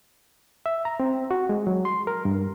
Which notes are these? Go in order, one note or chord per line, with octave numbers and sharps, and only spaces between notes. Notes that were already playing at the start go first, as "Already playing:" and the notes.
E5
A#5
C4
F#4
G#3
F#3
C6
A#4
G2